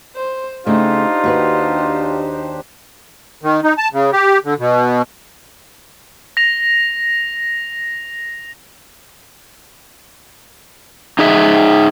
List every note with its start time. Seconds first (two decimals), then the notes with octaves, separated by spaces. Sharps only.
0.16 C5
0.67 C#3 A3 D4 D#4 F4 G4 C5
1.24 D#2 F#4 B4
3.43 D#3
3.64 D#4
3.78 A5
3.93 C#3
4.13 G4
4.44 D3
4.59 B2
6.37 A#6 F7
11.19 D#4 G#4 E5